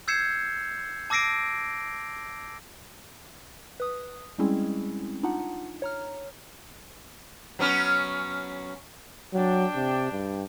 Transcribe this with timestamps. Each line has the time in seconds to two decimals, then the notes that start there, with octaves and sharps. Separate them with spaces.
0.08 E6 G6 G#6 C7 C#7 E7
1.10 A5 D6 E6 A#6 C7 D7
3.80 B4 D#6
4.38 G3 G#3 C4 C#4 E4 G#4
5.23 D4 D#4 F4 F#5
5.82 C#5 A#5 F6
7.59 F#3 B3 C#4
9.33 F#3 D4 G5
9.76 C3
10.12 G2